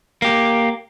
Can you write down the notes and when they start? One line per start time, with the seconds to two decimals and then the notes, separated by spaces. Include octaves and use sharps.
0.22 A#3 G4